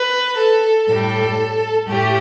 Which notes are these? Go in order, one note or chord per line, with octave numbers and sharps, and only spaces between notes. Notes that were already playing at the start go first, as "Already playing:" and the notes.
Already playing: B4
A4
A2 G3 A4
A2 A3 G4